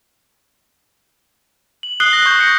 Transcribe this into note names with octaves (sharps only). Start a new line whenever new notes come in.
F#7
D#6 F#6 C7 G7
A#6
C#6 F#6 G6
A#6 C#7